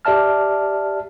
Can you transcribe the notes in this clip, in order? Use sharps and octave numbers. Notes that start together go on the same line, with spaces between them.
G4 D5 E5 A5 F6